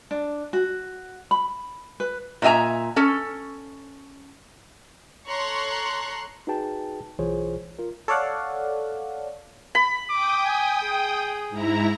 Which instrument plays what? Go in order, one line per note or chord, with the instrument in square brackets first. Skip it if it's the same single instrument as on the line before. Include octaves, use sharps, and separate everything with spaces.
[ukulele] D4
F#4
B5
B4
[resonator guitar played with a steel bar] A#2 D#5 E5 G#5 A#5
C#4 A4
[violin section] A4 C#5 A#5 C6 C#6 F#6
[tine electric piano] D#4 F#4 G#4 B4 G5 A5
B1 E3 F4 G#4 C5 C#5
F4 A#4
[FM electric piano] A4 C#5 D5 F5 F#5
[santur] B5
[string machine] G5 D#6 [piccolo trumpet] D6
[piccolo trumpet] G#5
G#4
[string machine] G#2 E4 A#5